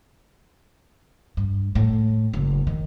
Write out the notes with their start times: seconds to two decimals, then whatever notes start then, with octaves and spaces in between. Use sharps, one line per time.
1.37 G2
1.75 A2
2.33 F#1
2.67 D#3